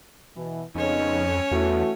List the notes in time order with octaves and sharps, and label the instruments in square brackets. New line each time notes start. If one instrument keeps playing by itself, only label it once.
[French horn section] B2 E3
[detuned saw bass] F2 [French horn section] C#3 B3 D#4 [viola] C#4 C#5
[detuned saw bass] E2 [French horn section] E3 A3 F#4